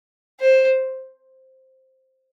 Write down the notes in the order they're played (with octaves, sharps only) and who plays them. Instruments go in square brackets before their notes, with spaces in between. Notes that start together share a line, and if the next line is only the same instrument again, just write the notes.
[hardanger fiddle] C5